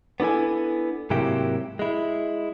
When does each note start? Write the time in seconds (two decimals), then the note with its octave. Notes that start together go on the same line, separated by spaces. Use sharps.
0.20 B3 D4 E4 A4 G#5
1.10 G#2 C3 F#3 A#3 E4 G4
1.79 G#3 E4